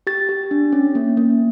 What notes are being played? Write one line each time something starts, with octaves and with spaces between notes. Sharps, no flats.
G4 A6
G4
D4
C#4
A#3
A#3